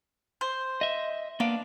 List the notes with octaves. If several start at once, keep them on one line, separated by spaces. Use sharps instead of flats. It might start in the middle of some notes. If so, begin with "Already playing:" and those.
C5
D#5 E5
A#3 B3 D4 F5